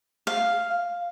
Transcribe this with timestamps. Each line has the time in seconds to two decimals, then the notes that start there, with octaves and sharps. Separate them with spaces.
0.27 F5